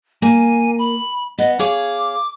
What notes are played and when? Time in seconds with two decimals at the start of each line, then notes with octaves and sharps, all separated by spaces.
0.22 A#3 G#5
0.79 B5
1.38 B3 D#5
1.59 G#4 C#5 F5 D6